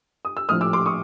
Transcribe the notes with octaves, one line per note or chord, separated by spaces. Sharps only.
D#6
E6
A#1 A2 F3 D#6 F6
D6 E6
C6 D6
C#6 D#6